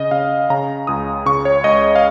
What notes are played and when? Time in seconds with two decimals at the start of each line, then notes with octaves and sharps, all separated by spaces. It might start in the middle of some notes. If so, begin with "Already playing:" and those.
Already playing: C#3 D#5
0.11 C#3 F5
0.50 C#3 A#5
0.87 C#2 D#6
1.26 C#3 C#6
1.45 C#5
1.64 C#2 D#5
1.96 F5